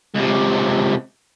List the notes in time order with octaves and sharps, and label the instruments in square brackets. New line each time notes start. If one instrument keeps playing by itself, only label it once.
[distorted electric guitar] C#2 C3